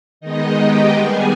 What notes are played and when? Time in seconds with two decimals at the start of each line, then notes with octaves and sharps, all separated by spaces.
0.21 D#3 G#3 B3 D#4 D#5
0.58 G4 G5
0.96 D#3 G3 B3 G#4 G#5